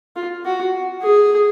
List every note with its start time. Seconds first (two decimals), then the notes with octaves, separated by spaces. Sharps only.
0.16 F4
0.45 F#4
1.02 G#4